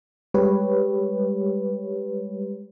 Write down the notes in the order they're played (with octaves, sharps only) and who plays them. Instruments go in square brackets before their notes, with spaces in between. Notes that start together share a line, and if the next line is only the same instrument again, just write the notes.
[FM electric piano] G3 G#3 G4 B4 C#5